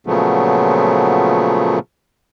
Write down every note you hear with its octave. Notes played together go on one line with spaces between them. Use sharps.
A#2 C#3 F3 F#3 A3 B3